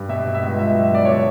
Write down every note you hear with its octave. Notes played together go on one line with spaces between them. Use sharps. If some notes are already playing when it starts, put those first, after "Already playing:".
Already playing: G2
B2 E5
B2
E5
C#2
C#2 E5
F#3
E5
B2 D5
D3 C#5